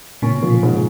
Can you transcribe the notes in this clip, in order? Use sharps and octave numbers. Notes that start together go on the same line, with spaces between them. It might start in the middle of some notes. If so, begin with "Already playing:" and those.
A#2 C#3 C#4
B2 F3
A#2 C#3
G#2